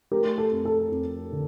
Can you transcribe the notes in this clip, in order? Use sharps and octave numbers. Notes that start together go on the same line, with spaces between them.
A3 G4 A#4
A4
F2
A4
F2
D3